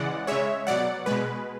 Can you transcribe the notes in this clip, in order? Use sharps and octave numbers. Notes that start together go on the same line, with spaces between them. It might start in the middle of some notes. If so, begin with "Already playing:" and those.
Already playing: C#3 E3 G#3 D5 F#5
C#3 G#3 C#5 E5
B2 F#3 D5 F#5
B2 G#3 B4